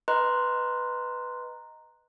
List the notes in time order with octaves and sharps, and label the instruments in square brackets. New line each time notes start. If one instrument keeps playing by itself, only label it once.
[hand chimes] B4 D#5 A#5 C6 F#6